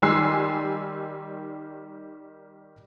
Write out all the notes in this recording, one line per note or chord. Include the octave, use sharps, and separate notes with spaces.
D#3 G3 G#5 C6 E6 C7